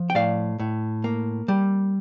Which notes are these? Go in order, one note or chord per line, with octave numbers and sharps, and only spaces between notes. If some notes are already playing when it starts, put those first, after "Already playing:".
Already playing: F3
G5
A2 D5 F5
A2
A#3
G3